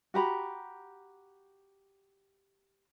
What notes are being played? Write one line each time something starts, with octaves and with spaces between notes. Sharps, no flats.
F#4 G4 A#5 B5